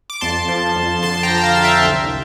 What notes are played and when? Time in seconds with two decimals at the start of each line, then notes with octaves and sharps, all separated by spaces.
0.10 D6
0.21 F2 A5 C6
0.48 F3
0.76 F2
1.03 D3 A5 C6
1.14 C6
1.23 G5 A#5
1.30 F3
1.38 A#5
1.43 F5 A5
1.56 D3 A5
1.64 E5 G5
1.85 C2